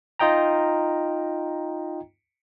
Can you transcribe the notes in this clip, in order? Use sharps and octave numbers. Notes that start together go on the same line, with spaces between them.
D#4 F4 D#5 G5 A#5